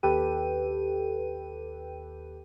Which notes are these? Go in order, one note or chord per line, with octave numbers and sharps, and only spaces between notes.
D#2 G4 A4 B4 G5 D#7